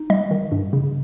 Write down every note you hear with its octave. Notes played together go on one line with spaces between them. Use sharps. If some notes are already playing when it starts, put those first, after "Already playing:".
Already playing: D#4
G3 D#5
D#3
G2
C#3